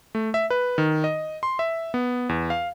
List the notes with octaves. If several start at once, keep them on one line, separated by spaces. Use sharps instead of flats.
A3
E5
B4
D#3
D#5
C6
E5
B3
E2
F5